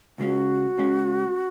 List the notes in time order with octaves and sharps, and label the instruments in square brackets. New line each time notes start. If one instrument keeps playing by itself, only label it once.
[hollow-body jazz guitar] C#2 C#3 G#3 C#4 [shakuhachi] F#4
[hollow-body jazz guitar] C#2 C#3 G#3 C#4